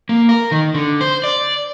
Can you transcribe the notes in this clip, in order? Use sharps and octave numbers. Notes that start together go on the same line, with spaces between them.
A#3
A#4
D#3
D3
C5
D5